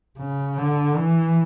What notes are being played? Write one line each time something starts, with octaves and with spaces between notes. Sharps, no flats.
C#3
D3
E3